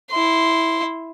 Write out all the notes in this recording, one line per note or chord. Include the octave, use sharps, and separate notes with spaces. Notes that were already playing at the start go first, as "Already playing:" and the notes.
E4 C6